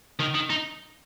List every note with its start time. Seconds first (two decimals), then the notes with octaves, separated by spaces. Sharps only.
0.20 D#3
0.35 D#3
0.50 D#4